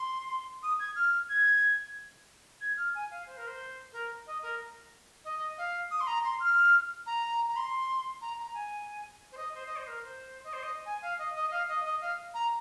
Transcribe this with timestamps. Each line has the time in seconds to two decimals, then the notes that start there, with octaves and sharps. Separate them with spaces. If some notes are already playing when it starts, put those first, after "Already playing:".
Already playing: C6
0.63 D#6
0.79 G#6
0.96 F6
1.29 G#6
2.61 G#6
2.77 F6
2.95 G#5
3.11 F5
3.27 C5
3.37 A#4
3.47 C5
3.93 A#4
4.27 D#5
4.42 A#4
5.24 D#5
5.58 F5
5.91 D#6
6.00 C6
6.07 A#5
6.24 C6
6.40 F6
7.06 A#5
7.48 A#5
7.56 C6
8.21 A#5
8.39 A#5
8.54 G#5
9.32 C5
9.37 D#5
9.54 C5
9.66 D#5
9.76 C5
9.87 A#4
10.03 C5
10.44 D#5
10.53 C5
10.63 D#5
10.86 G#5
11.02 F5
11.18 D#5
11.35 D#5
11.51 F5
11.68 D#5
11.84 D#5
12.01 F5
12.34 A#5